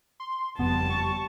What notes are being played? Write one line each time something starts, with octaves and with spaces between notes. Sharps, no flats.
C6
F#1 F2 G3 B3 A5
C#6